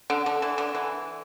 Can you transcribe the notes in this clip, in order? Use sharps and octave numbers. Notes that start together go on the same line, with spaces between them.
D3
D3
E3
D3
E3